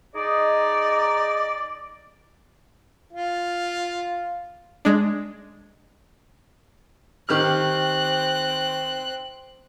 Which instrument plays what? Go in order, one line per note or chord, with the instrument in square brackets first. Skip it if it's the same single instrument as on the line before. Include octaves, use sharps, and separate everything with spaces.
[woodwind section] D#4 G#4 D#5 [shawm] D5
[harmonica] F4
[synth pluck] G#3 D4
[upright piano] D#3 G4 F6 [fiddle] C4 F#6